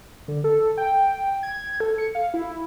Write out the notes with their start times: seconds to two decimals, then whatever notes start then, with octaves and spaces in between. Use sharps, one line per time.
0.28 D3
0.44 A4
0.78 G5
1.43 G#6
1.80 A4
1.98 C#7
2.15 F5
2.34 E4